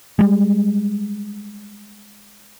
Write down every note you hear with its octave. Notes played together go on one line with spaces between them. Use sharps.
G3 G#3